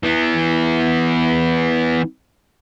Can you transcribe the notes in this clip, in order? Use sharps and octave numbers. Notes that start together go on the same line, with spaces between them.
E3 B3